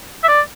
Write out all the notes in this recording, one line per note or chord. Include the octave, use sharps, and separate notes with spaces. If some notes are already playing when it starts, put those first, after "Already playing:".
E5
D5